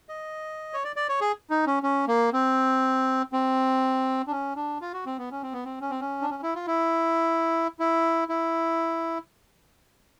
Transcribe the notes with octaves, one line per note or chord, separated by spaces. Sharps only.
D#5
C#5
D5
D5
C#5
G#4
D#4
C#4
C#4
A#3
C4
C4
D4
C#4
D4
F4
F#4
C4
B3
C#4
C4
B3
C4
C#4
C4
C#4
D4
C#4
E4
F4
E4
E4
E4